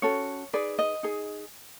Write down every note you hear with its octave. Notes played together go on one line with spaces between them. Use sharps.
C#4 F#4 A4 C#5
D#4 G#4 B4 D5
D#5
D#4 G#4